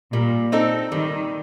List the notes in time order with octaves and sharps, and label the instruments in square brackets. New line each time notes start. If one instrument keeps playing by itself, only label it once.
[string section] A#2 [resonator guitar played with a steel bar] G3
[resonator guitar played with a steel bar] C4 D#4 A4
[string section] D#3 [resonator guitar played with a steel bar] G3